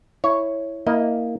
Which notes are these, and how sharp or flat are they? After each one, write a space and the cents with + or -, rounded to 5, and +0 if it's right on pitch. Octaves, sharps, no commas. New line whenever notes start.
E4 +0 C#5 +0
A#3 +0 E4 -25 D#5 +0